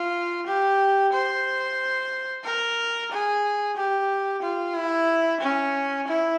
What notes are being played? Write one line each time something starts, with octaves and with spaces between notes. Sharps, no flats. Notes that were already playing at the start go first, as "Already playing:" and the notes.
Already playing: F4
G4
C5
A#4
G#4
G4
F4
E4
C#4
E4